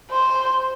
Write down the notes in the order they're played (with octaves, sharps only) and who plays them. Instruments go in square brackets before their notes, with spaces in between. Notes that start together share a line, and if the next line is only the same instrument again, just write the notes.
[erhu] C5